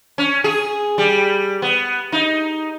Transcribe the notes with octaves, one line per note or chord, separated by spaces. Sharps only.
C#4
G#4
G3
B3
D#4